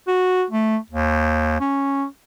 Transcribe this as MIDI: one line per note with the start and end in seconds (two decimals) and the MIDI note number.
0.08 0.45 66
0.50 0.77 57
0.90 1.56 39
1.60 2.05 61